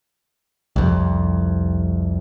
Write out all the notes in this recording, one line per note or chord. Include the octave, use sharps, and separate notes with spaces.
C2 F2